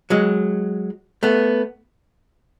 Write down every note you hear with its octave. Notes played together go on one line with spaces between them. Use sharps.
F#3 G#3
A3 B3